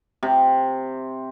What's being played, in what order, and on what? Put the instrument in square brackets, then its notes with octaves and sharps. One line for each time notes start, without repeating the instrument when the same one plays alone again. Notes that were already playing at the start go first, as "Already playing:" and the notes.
[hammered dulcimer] C3